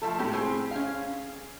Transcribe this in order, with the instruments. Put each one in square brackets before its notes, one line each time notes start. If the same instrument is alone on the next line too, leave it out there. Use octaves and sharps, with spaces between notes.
[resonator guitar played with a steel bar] F3 A3 A4
[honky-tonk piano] A2 [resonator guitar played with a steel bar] G4
[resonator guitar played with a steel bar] C4 [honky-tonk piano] G#4
[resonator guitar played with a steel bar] C#4 F5